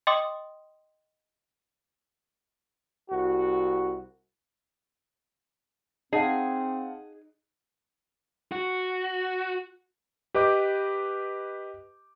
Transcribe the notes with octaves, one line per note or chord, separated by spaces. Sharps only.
D#5 G5 C6 D6 D#6
C2 F#4
C4 D#4 G#4 F5 F#5 A5
F#4
G4 B4 D#5 D6 G6